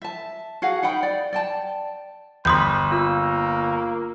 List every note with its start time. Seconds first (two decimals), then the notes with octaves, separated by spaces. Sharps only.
0.02 E5 A5
0.62 F#4 G#4 F5 F#5
0.82 D#4 F#5 G5 B5
1.03 D5
1.33 D5 G5 A5
2.45 G1 B5 C6 D#6 G6
2.91 A#3 F4 E6